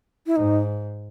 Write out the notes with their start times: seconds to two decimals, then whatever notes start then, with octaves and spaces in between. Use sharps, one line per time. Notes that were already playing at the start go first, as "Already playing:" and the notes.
0.27 E4
0.36 G#2 D#4